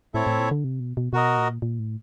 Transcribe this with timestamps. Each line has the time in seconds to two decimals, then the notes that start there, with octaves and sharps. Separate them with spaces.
0.14 A2 C4 E4 A4 C#5 E5
0.27 A2
0.39 A#2
0.51 D3
0.64 C3
0.80 B2
0.97 B2
1.13 B2 F#4 A#4 D#5
1.37 A#2
1.62 A#2
1.79 A2